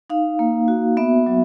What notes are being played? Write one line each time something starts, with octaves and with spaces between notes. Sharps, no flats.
D#4 F5
A#3
F#4
B3 E5
F#3